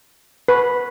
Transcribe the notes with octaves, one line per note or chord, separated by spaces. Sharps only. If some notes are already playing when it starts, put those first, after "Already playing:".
B4